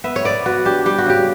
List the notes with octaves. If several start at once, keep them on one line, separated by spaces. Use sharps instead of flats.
B3 E5
C#5
B3 D5
B3 F#4
D4 G4
G3 G4
F#4
C#3 G4